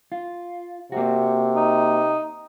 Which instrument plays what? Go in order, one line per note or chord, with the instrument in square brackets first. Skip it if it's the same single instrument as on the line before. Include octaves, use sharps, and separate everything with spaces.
[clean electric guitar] F4
[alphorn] C3 [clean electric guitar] A#3 F#4
[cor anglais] D#4